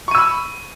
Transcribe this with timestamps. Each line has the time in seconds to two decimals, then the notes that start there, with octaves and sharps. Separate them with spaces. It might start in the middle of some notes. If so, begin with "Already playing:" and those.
0.08 C#6
0.11 D#7
0.15 E6
0.18 B5